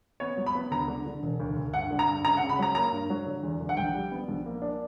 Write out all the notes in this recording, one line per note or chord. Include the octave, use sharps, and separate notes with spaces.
B3 C#5
F#3
B5
B3
D2 A#5
D3
D3
E1
D2
D2
G2 F#5
D3
A#5
G2
C#3 A#5
F#5
C#3
B5
F#3 A#5
A#3 A#5
G2
F#3
D3
E2
D3
F#5
A#1 G5
G3
B3
A#1
A#3
D4